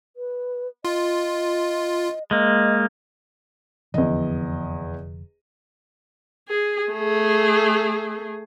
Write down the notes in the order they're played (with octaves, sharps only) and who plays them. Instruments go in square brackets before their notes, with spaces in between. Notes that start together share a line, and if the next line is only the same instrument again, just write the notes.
[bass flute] B4
[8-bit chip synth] F4 [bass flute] D#5
[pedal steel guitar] G#3 A#3 [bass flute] D#5
[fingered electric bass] F1 D3 F3 [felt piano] E2 D#5
[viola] G#4
A3 G#4